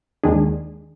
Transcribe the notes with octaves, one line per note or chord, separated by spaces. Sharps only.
D#2 D#3 G#3 D4 G#4